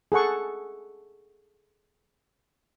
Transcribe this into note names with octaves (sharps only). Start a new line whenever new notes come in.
G#4 A4 F#5 C#6